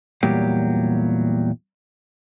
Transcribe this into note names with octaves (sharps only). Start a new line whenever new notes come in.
E2 A#2 F#3 G3 G4